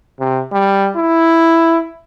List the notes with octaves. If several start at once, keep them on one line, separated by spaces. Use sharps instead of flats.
C3
G3
E4